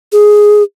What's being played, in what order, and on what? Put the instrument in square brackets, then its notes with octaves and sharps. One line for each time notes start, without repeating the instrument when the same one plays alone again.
[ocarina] G#4